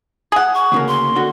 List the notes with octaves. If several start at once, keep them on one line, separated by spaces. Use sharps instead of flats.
G#4 F#5
C#6
D2 C#3 A#3
C6
D3 F#4